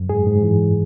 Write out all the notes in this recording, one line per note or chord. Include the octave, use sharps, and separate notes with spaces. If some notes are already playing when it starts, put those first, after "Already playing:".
Already playing: F#2
G#2 G#4
G#2
E3